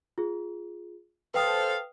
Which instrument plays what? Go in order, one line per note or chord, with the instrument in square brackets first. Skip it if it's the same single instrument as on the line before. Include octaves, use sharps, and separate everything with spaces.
[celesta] F4 G#4
[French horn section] A4 C5 [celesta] B4 G5 D#6 [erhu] F5